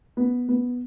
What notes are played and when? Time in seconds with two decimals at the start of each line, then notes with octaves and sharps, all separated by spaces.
0.17 B3
0.49 B3